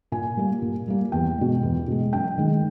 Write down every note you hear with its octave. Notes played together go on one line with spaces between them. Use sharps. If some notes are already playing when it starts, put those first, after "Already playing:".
A#2 G#5
G3 A#3
A#2
G3 A#3
E2 G5
B2 G#3
E2
B2 G#3
F#2 G5
D#3 G#3